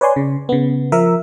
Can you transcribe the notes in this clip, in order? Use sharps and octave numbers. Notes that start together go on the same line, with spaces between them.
B4 C#5 D5 G#5 C6
C#3
C#3 B3
F3 A#4 E5